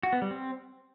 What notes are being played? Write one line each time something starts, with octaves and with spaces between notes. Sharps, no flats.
F#4
B3
G3
C4